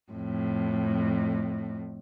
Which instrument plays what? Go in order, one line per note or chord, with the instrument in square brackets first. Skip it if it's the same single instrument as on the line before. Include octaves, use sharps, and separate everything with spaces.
[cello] F2 A2